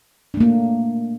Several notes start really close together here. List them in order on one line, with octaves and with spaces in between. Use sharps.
D4 A3 A#3